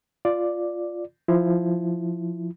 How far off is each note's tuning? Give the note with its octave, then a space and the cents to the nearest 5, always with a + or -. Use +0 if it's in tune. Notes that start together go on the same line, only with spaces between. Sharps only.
F4 +0 D5 +0
F3 +0 E4 +0